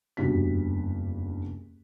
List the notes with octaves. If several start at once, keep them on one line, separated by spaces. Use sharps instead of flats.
F#1 E2 G2 F#4 G4 B6